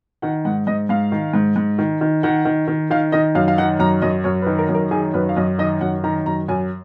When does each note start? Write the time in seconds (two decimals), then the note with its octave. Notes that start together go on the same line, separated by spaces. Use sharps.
0.22 D#3 F#5
0.45 G#2 F#5
0.67 G#2 D#5
0.89 G#2 F5
1.12 D#3
1.34 G#2
1.56 G#2
1.79 D#3
2.01 D#3
2.23 D#3 F#5
2.45 D#3
2.68 D#3
2.90 D#3 F5
3.12 D#3 D#5
3.35 F#2 F5
3.48 F5
3.58 D#3 F#5
3.79 F#2 A#5
4.02 F#2 D#5
4.24 F#2 C#5
4.42 B4
4.46 D#3
4.58 A#4
4.69 F#2
4.74 A#4
4.91 D#3 G#4
5.14 F#2 B4
5.29 F5
5.37 F#2 D#5
5.58 D#3 D#5
5.81 F#2 F#5
6.04 D#3 A#5
6.26 F#2 A#5
6.48 F#2 G#5